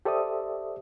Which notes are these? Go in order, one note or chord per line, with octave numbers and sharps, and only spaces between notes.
G4 A4 C5 D5 E5 D#6